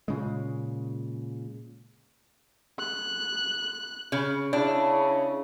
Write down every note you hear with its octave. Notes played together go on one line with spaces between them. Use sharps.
A#2 C#3 G#3
F#6
C#3
C#3 D4 E4